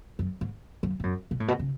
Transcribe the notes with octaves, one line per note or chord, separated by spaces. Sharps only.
F#2
G#2
F#2
G#2
F#2
B2
A2
B2
C#3